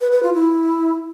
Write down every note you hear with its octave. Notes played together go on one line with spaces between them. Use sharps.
B4
B4
F4
E4